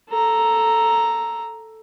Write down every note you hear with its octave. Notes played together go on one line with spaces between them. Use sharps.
A4 A#5